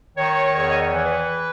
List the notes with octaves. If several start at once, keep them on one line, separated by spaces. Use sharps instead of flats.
D#3 C#5
E2 C#5
D#5
C#5
E3
B4